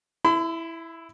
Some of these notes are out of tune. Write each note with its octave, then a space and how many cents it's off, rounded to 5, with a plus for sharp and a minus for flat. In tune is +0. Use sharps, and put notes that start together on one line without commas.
E4 +0 B5 +45